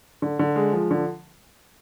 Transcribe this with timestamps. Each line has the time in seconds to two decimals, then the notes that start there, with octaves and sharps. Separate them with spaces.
0.22 D3
0.39 D3
0.56 G#3
0.73 F3
0.91 D3